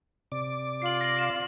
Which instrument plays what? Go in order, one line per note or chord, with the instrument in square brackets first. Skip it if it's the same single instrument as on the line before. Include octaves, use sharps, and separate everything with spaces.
[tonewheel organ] C3 D5 D6
[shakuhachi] F4 [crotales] C7 F#7
[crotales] A#6 F#7
E7